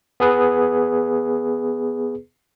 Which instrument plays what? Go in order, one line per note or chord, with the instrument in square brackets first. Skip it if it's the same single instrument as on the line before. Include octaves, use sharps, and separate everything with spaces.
[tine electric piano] B3 G#4 B4